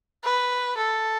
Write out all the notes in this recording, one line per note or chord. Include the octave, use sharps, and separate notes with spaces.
B4
A4